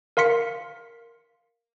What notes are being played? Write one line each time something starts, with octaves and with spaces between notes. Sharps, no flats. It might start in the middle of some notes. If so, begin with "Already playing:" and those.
A#4 F5 C6 B6 C#7